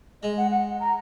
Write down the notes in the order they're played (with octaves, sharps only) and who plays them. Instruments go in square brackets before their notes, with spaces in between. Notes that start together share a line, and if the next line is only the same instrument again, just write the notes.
[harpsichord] G#3 [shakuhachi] D#5
[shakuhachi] F#5
F#5
A#5